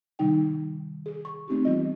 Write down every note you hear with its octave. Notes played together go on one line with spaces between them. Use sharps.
C3 D#3 G3 D#4 G5
G#4
C#6
A3 C4 D#4 G4
E3 G3 B3 F4 D#5